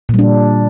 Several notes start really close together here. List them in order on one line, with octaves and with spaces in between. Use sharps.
A#2 G3 D4